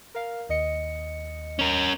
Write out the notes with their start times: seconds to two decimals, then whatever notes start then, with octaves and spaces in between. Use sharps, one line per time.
0.15 A#4 F5
0.49 D#2 D#5 C#7
1.59 C#4 A#4